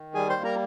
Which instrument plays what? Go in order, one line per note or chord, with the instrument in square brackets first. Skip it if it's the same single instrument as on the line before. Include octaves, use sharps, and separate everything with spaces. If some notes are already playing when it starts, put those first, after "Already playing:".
Already playing: [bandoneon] D#3
G3 G#4 G#5
C5 C6
A#3
A#4 A#5